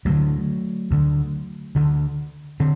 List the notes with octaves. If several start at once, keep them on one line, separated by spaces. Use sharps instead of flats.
D2 D3 F#3 A3
D2 D3
D2 D3
D3 C4